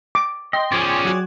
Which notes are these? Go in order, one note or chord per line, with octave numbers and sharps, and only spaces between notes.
D6
D#5 G5 C6
F3 C#4 G#4 C#5 D5
F#3 F#4